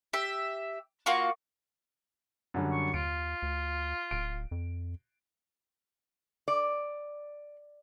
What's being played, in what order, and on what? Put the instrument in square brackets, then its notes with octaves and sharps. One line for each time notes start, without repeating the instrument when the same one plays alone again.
[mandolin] G4 E5
A#3 F4 F#4 C#6
[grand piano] F#2 D3 G3
[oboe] C#6
[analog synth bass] D#2 [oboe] F4 [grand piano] D7
[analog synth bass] D2
[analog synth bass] D1 [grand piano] D7
[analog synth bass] F2
[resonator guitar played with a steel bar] D5